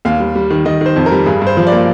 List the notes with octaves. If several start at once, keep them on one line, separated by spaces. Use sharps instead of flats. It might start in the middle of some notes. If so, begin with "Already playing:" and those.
D#2 F5
G3
G3
D#3
D#3 D#5
D#3 C5
F2
A#4
G3
G2 G#4
G2 C5
F3
D5
A#3